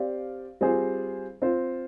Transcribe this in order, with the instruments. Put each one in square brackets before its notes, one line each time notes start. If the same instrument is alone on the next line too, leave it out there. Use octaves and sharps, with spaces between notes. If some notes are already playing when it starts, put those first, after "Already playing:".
Already playing: [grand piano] C4 G4 D5 F5
G3 C4 F4 G#4 C5
C4 F4 C5